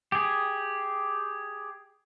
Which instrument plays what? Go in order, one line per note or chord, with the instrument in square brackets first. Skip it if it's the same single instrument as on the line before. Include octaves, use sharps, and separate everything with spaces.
[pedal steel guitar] G4 G#4